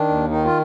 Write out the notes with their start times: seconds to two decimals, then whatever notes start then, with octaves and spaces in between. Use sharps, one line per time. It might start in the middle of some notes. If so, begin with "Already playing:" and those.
Already playing: D#3 D4
0.09 D#2
0.30 D#3 D#4
0.45 F4